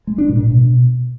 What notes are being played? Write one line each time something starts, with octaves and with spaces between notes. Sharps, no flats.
G#3
D4
A#2
A#2
B2